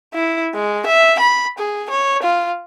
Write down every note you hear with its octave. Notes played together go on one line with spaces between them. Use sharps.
E4
G#3
E5
B5
G#4
C#5
F4